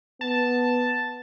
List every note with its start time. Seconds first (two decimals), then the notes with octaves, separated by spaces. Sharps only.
0.21 B3 A5